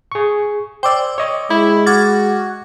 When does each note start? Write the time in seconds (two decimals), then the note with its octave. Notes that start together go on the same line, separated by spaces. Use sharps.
0.12 G#4 C#6
0.83 C5 D5 G5 D6 E6
1.18 C#5 D#5 C#6
1.50 G#3 E4
1.86 F#4 D6 F6 G#6 A6